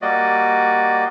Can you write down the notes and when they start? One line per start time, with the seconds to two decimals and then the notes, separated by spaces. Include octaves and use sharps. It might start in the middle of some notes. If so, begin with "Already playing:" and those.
0.02 G3 A#3 F#4 D5 D#5